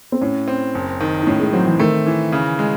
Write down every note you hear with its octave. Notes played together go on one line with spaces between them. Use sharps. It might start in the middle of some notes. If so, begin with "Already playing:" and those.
C4
A2 C#4
C4
F#1
D#3
D#4
A2 C#4
G#3
F#3 C4
E3
D#3 A3
E3
C#3
G#3